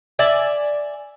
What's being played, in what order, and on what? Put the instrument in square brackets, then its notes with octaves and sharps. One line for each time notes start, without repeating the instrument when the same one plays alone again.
[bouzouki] D5 E5 G#5